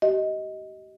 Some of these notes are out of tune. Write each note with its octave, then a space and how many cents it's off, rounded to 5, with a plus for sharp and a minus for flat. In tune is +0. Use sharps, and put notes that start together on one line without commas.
G4 -35 D#5 +15